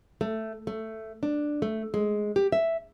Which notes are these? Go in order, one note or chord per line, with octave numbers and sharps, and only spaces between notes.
A3
A3
D4
A3
G#3
G4
E5